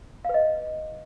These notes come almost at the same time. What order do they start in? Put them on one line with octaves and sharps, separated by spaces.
F5 B4 D#5